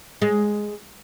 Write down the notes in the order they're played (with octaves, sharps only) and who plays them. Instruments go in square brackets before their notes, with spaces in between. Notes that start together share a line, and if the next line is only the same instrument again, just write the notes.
[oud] G#3